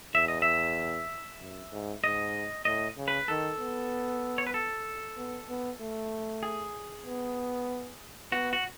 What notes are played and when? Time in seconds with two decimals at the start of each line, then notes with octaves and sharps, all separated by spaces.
0.15 E2 E5
0.28 D#5
0.42 E5
1.40 F#2
1.72 G#2
2.03 G#2 D#5
2.65 A2 D#5
2.97 C#3
3.08 B4
3.28 D#3 A4
3.60 B3
4.38 C#5
4.47 B4
4.54 A4
5.17 B3
5.49 B3
5.81 A3
6.43 G#4
7.06 B3
8.32 B3 F#4
8.53 F#4